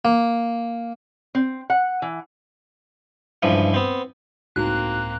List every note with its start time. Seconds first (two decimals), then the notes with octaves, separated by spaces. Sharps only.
0.05 A#3
1.35 C4
1.70 F#5
2.02 E3
3.43 C#2 G2 E3 F3
3.74 B3 C4
4.56 C#2 A2 A#3 C4 D#4 F#4 F#6